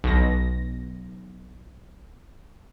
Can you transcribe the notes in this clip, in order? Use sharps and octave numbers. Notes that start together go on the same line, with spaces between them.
B1 A#6